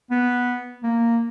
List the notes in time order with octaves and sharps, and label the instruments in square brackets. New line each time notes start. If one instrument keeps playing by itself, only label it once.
[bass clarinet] B3
A#3